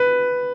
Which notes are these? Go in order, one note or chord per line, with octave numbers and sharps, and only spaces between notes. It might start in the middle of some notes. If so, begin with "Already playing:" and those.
Already playing: B4